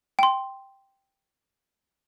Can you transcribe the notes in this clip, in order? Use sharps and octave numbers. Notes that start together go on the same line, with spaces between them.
G5 C6